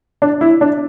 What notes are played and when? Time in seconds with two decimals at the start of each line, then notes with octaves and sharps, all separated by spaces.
0.22 D4
0.41 E4
0.61 D4